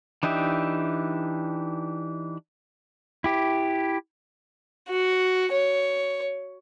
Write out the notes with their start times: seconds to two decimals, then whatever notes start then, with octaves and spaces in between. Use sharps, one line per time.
0.23 E3 D4 D#4 G4 E5
3.24 E4 G4
4.89 F#4
5.52 C#5